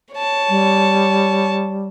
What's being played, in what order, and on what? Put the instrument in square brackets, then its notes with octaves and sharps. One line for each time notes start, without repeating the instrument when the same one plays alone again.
[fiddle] C#5 A5
[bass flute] G3